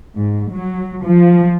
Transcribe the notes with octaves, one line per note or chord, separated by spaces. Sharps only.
G#2
F#3
F3